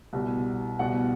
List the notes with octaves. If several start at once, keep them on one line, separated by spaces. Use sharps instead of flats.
C2 B2 G3
C2 B2 G3 F#5